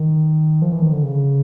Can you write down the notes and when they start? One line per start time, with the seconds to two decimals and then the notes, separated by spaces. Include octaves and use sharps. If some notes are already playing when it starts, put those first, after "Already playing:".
Already playing: D#3
0.62 F3
0.72 E3
0.82 D#3
0.92 D3
1.03 C#3